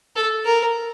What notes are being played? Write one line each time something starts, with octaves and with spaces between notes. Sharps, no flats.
A4
A#4